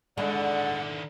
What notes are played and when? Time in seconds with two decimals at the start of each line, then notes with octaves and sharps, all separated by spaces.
0.17 D3 D#3 G#3 E4 D5 F#5